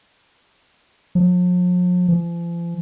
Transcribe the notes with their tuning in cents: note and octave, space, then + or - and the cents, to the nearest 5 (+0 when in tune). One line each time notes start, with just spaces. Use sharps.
F3 +45
F3 -40